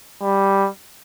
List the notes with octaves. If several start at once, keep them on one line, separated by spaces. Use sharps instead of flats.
G3